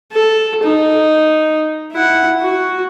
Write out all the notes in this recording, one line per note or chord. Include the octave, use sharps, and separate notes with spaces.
A4
D#4
E4 F#5
F#4